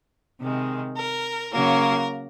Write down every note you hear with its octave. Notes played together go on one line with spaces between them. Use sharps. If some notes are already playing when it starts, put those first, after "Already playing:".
C3 D#3 G#3
A#4
C#3 F#3 A#3 A#4